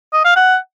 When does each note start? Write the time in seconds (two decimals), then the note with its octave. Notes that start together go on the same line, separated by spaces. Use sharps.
0.13 D#5
0.25 F5
0.36 F#5